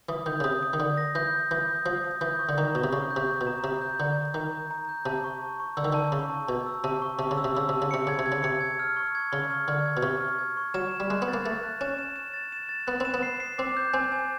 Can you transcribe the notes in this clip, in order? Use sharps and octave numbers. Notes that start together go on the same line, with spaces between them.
E3 D#6
D#3 G6
C#3
C3 D#6
D#6
D#3
D3 D#6
A#6
E3 G6
G6
E3 G6
D#6
F3 D#6
D#6
E3 G6
C#6
D3
D#3 A#5
B2 C#6
C3
C#3 C#6
G6
C3
C#6
B2
A#5
C3 A#5
G6
D3 A#5
A#5
D#3 A#5
G6
A#5
G6
C3 A5
C#6
A5
C#6
D3 E6
D#3
D3 A5
C#3 C#6
A5
B2 A5
E6
C3 A5
C#6
C3 A5
C#3
E6
C3
C#3 E6
C3 A5
C#3
C3 C#7
C#3 G#6
C3
G#6
C#3
C3 C#7
G#6
F6
C#6
G#6
C#3 C#6
F6
D3 F6
G#6
B2
C3 C#6
F6
G#6
C#6
F#3 E7
E7
G3
G#3 F#6
B3
A6
A#3
A3 A6
F#6
C#4 E7
E7
E7
A6
E7
A6
B3 F#6
C4 E7
B3
C7
C7
C4 D6
G6
C4 G#5
G#5